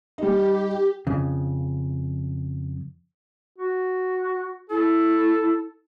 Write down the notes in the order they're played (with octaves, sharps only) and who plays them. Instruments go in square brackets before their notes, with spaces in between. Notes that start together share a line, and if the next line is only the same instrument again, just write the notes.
[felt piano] G3 D#4 [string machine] G4
[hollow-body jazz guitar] F2 C#3
[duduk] F#4
[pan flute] E4 [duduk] A4